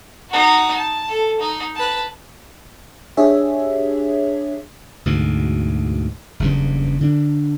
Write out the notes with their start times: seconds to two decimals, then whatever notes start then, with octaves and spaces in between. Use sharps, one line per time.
0.30 D#4 F#4
0.73 A5
1.09 A4
1.40 D#4
1.75 B4 A5
3.17 D4 G4 G#4 C#5 E5
5.06 D2 G#2 B2
6.40 F#1 E2 G2 C#3
7.01 D3 D4